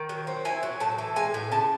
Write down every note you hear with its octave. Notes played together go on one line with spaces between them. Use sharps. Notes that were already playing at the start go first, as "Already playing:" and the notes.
Already playing: D#3
F#3
C4
E4 G#5
F#3
A2 A5
E3
G#3 G#5
A2
C#3 A5